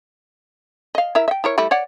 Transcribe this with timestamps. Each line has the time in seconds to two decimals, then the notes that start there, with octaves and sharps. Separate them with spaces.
0.95 D#5 F5
1.15 E4 A#4 E5
1.28 E5 G5
1.44 E4 A#4 C#5
1.58 G3 A3 E4
1.71 C#5 D5 F#5